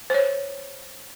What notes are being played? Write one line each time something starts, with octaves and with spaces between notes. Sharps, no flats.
C5 C#5